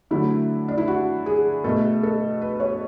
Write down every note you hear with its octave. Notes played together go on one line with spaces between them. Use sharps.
D3 F#3 A3 E4
D4
E4
F#4
G#4
B2 A3 A4
A4
B4
C#5